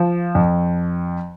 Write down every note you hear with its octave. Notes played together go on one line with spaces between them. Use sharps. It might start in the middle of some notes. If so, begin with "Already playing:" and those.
Already playing: F3
F2